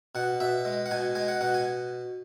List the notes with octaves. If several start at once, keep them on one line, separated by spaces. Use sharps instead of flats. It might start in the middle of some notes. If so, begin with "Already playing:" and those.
B2 F#5
B2 E5
G#3
F#5
B2 G#5
G#3 G#5
F#5
B2 F#5
G#5